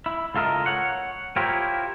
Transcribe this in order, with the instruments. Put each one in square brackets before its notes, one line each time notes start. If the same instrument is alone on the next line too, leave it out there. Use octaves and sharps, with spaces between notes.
[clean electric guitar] E4
C#2 F4 A4 A#4 D#5
C#5 F#5
E4 F4 G4 A#4 C5 C#5